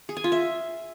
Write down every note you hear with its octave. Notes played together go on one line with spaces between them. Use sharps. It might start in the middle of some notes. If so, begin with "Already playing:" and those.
G#4
G#5
F4
E5